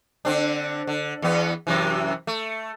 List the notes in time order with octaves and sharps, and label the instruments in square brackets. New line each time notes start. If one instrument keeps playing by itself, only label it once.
[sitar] D3 C4 D4
D3
E2 B3
F#2 C3 E3
A3